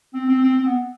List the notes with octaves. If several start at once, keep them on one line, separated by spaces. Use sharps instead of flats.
C4
C4
C4
C4
B3